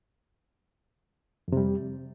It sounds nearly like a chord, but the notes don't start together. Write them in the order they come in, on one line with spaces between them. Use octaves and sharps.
F2 C3 G3